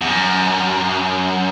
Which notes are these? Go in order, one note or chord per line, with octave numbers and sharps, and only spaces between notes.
E2
F#2